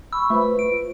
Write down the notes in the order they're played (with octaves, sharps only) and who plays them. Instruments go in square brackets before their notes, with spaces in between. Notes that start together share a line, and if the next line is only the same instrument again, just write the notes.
[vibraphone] B5 C#6 [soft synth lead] E6
[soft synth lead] A3 [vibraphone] F4 B4 C5
[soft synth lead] D7